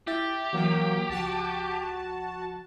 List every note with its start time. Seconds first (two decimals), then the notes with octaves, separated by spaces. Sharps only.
0.07 E4 G4 E5 A6
0.53 E3 F#3 A#3
1.09 C#2 F3 F#4 A5